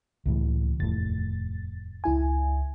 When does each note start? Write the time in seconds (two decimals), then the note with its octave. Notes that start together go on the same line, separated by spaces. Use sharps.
0.26 C#2 A2 E3
0.80 F1 D#2 A2 A6
2.04 C#2 E4 G#5